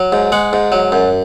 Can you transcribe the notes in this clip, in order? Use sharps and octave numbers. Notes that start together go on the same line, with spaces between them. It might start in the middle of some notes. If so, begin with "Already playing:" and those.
Already playing: F#3
G#2
G#3 F#5
G#2
F#3
F#2